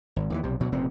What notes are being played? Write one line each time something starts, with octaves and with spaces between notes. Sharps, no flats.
G#1
D#2 D3 E3
B1 C3
D2 B2 F#3
F1 A#2 C#3 C4